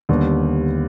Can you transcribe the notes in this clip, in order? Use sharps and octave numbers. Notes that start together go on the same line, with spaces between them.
D#2 D3 G3 B3